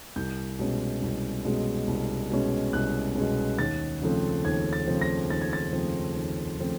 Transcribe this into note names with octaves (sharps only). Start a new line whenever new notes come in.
C2 G6
B2 G#3 C#4
C2
B2 G#3 C#4
C2
B2 G#3 C#4
C2 F#6
B2 G#3 C#4
D#2 A6
C#3 F3 A3 C4
D#2 G#6
A6
C#3 F3 A3 C4
A#6
D#2 A6
G#6
A6
C#3 F3 A3 C4
D#2
C#3 F3 A3 C4